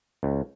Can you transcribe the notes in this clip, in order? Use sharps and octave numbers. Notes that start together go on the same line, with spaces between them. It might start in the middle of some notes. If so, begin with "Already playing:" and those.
C#2